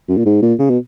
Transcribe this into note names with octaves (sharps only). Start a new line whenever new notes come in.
F#2
A#2
G#2
A#2
C#3
B2